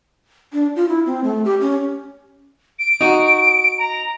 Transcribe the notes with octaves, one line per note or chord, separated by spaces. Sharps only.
D4
F4
E4
C4
A3
G4
C#4
D7
D#4 F#4
A#5